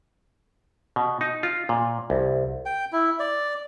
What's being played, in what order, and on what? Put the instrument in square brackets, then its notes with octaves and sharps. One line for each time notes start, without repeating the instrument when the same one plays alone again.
[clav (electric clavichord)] B2
D#4
F4
A#2
C2
[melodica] G5
E4
D5